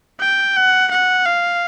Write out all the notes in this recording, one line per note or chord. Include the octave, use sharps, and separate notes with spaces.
G5
F#5
F#5
F5